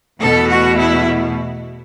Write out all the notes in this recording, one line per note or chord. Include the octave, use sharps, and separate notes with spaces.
E2 B2 A3 A4
F#4
E4